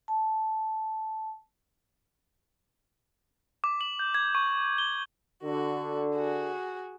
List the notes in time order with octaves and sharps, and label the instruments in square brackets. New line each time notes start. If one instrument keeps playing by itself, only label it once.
[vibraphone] A5
[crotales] D6
F#7
G6
G#6
C#6
G7
[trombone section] D3 [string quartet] F#4
[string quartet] F#4 G#4